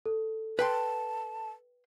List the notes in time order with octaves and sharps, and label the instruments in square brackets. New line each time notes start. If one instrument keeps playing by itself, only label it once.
[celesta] A4
[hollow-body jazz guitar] B4 G5 C6 [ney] A5